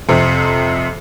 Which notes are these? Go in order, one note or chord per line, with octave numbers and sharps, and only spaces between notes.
F2 C3